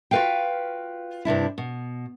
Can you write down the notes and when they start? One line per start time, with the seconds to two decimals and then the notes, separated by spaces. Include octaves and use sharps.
0.11 F4 F#4 G#4 B4 F5 G5
1.25 G2 C3 D4 E4
1.58 B2